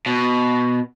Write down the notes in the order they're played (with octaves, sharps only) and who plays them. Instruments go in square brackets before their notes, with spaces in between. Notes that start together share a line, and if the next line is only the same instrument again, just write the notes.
[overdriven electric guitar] B2